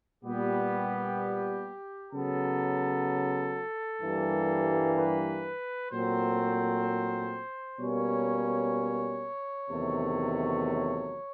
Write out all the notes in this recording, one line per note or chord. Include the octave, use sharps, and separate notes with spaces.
A#2 G3 B3 G4
C#3 F#3 B3 A4
G2 E3 G3 A#3
B4
A#2 F#3 A3 C4 C5
B2 G3 A#3 C#4 C#5
E2 C3 D#3 F#3 A3